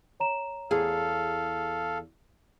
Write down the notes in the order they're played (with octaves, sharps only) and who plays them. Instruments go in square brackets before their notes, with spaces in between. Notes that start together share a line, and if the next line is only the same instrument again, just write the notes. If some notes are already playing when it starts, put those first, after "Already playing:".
[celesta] C#5 A#5 E7
[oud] E2 G#4 [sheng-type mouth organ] A4 F5